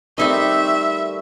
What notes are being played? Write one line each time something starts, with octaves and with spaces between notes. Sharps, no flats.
D#3 G3 A3 C4 D#4 D#5 E5